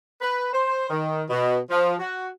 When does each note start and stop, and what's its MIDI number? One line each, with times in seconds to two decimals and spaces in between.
0.21 0.49 71
0.53 0.86 72
0.90 1.22 51
1.30 1.58 47
1.71 1.94 53
2.00 2.27 66